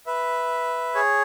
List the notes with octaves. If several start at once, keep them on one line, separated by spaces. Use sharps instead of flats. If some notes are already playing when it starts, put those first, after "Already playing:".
B4 E5
G#4 C#5